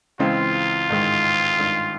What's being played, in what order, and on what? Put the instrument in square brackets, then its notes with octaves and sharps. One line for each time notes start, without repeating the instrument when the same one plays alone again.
[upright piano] C#2 C#3 E3 G#3 C4 [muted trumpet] F4
[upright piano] A1 G#2 D#3 G#3
G#1 G2 D#3 G#3